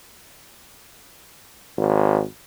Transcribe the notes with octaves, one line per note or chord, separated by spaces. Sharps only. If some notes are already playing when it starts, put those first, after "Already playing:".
G#1